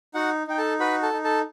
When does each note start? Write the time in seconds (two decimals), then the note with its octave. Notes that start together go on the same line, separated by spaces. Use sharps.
0.14 D#4 F#4 F#5
0.47 D#4 G5
0.58 A4 A5
0.80 F#4 B4 B5
1.03 A4 A5
1.13 D#4
1.24 A4 A5